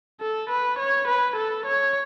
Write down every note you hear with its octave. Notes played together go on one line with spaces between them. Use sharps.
A4
B4
C#5
B4
A4
C#5